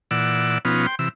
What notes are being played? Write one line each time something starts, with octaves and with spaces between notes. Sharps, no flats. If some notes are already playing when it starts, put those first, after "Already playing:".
A#2 E3 D5 F#5 E6
B2 F3 B3 C#4 D#4 F4
G5 C6
C3 E3 E6